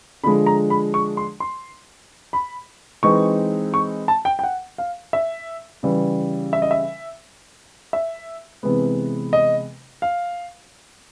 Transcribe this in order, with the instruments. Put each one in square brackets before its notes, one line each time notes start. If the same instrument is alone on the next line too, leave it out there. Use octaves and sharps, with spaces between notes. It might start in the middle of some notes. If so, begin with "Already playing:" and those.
[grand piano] D3 F3 G#3 B5
A#5
B5
C#6
C6
C6
B5
E3 G#3 C4 D#4 C#6
C#6
A5
G5
G5
F#5
F5
E5
C#3 E3 G3
E5
D#5
E5
E5
C3 E3 G#3 B3
D#5
F5